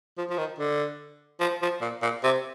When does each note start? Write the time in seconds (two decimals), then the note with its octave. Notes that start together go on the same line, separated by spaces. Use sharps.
0.17 F3
0.30 F3
0.38 D#3
0.58 D3
1.40 F3
1.62 F3
1.81 A#2
2.02 A#2
2.24 C3